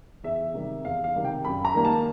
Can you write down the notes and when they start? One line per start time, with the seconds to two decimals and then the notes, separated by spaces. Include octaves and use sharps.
0.24 E2 E5
0.54 C3 D#3 G3
0.84 E2 F5
1.04 F5
1.15 C3 D#3 G3
1.25 G5
1.45 F#2 B5
1.65 A#5
1.74 D#3 G3 A#3
1.85 A5